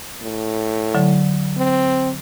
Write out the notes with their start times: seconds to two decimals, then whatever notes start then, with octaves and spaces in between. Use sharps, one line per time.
0.22 A2
0.95 D3 F#3
1.57 C4